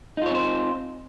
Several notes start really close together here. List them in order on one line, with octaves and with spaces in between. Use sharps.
D#4 F4 C#5 C4 C5